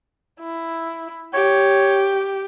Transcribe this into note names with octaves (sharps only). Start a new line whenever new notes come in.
E4
G4 C#5